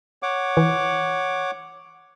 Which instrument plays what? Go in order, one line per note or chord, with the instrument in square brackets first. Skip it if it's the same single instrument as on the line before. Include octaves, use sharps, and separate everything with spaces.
[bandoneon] C#5 F#5 D6
[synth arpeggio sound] E3